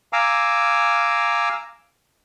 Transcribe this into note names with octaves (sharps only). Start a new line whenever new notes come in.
F5 G#5 A#5 D6 E6